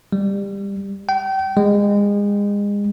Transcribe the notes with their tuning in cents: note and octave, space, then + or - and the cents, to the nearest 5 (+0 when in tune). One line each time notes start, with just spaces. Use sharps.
G3 +20
G5 -30
G#3 -30